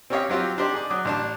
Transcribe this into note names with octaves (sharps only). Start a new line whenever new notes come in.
C4 C#4 G4 C#5 D#5 F5
F#3 C4 F4 G4
D4 D#4 G4 C5 D5
G#4 D5
F#3 D6 D#6
A1 D4 A5